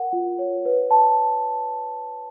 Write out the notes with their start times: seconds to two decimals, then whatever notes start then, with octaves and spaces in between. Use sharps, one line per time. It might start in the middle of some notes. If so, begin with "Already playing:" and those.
Already playing: A#4 F#5
0.13 F4
0.39 C#5
0.65 B4
0.91 A5